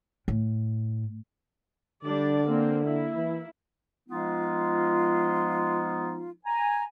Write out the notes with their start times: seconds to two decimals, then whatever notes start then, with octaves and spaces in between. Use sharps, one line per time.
0.28 A2
2.04 D3 G3 D4 D5
2.46 A#3 C4
2.85 A#3 E4
3.16 E3
4.09 F3 G#3 B3 D#4 F4
6.45 G#5 A#5